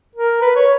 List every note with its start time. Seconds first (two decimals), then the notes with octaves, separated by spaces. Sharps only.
0.15 A#4
0.41 B4
0.56 C#5